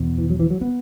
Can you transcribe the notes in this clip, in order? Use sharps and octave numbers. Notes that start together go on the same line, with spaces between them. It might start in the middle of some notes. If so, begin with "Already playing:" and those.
Already playing: E2 B2
E3
F#3
E3
F#3
B3